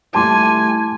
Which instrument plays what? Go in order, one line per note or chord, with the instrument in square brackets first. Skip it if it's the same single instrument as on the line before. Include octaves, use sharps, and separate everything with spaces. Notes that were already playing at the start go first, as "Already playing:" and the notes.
[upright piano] G3 A3 E4 [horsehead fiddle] G#5 [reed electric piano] A5 C6 D6